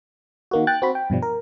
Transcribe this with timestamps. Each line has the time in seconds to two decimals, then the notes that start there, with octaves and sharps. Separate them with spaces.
0.51 D#3 A#3 F#4
0.67 G5 F#6 A6
0.82 C4 F#4 B5
0.95 G5
1.10 G2 B2 F3 G3
1.22 A#4